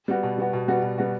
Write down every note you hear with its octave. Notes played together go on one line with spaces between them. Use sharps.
G3 B3 F#4
B2
G3 B3 F#4
B2
G3 B3 F#4
B2
G3 B3 F#4